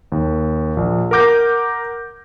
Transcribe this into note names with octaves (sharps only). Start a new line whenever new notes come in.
D#2
A#1
A#4 F#5 D6 G6 A#6